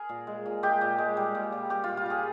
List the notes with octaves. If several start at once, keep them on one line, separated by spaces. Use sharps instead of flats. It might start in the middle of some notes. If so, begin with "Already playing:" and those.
Already playing: G#4 A#4
A#2
G#3
A#2
G#3 G4
A#2
G#3
G3
A#2
A#2
G3 G4
A#2 F4
F4
G3 G#4